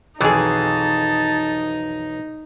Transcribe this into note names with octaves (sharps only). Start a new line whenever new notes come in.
B1 F2 D#3 E3 D#4 G#4 A5